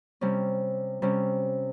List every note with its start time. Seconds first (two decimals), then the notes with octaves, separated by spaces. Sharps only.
0.21 C3 G3 C#4
1.02 C3 G3 C#4